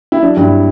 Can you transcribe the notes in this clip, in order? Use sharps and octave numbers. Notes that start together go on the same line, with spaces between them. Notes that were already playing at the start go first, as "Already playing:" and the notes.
E4
F#3 D4
G2 E4